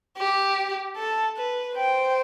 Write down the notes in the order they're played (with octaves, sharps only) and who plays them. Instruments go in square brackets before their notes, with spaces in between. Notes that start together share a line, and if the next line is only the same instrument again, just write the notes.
[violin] G4
A4
B4
[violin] C5 [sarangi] G5